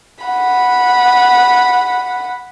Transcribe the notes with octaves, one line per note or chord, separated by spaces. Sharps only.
F#5 B5